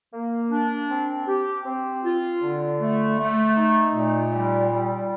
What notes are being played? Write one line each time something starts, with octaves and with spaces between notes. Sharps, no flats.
A#3
D4
C4
G4
C4
F4
D3
A3
A3
D#4
A#2
G3
G3